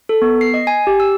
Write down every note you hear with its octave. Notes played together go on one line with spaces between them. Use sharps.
A4
B3
C7
D#5
G#5
G4
E6